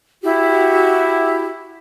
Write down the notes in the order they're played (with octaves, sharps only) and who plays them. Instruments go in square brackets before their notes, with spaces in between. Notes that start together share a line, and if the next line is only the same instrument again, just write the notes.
[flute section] E4 F#4 G4